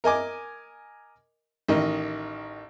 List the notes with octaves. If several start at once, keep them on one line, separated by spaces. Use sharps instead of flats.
A#4 D#5 G#5 D6
A1 D#3 D#5